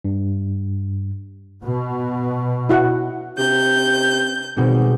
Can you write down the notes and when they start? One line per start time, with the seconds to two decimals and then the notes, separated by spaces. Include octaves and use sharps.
0.05 G2
1.63 B2
2.69 E4 F#4 F#5
3.38 C3 G6
4.56 G#1 B2 G3 G#3